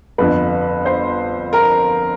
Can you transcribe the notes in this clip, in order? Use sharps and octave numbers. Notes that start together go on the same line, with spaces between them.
G1 F2 D3 B4
C5
A#4